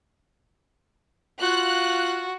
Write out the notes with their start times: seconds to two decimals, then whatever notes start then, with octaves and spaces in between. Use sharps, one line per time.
1.41 F4 F#4 F#6